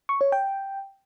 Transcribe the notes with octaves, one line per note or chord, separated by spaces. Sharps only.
C#6
C#5
G5